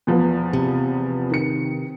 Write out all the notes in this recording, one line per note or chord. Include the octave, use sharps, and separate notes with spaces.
E2 F3 B3
C3
D#3 C#7